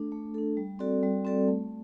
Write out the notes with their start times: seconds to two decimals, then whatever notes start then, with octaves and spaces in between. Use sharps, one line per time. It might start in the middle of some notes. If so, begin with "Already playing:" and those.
Already playing: A3 D4 A4
0.12 A3
0.34 D4 A4
0.57 G3
0.79 C4 F#4 A4 D5
1.03 G3
1.25 C4 F#4 A4 D5
1.48 A3